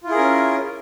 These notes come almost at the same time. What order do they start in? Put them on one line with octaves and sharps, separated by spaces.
F4 E4 G#4 A#4 C#4